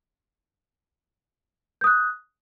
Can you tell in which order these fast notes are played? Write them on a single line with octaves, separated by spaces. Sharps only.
G6 D#6 F#6